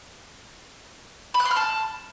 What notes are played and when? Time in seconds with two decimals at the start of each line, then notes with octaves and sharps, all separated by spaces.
1.34 B5
1.40 F#6
1.45 C6
1.51 F6
1.56 A5